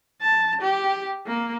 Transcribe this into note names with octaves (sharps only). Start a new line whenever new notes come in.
A5
G4
A#3